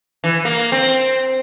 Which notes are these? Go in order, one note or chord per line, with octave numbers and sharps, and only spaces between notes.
E3
A#3
C4